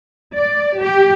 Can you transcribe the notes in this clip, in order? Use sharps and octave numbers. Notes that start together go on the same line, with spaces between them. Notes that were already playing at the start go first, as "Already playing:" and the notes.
D5
G4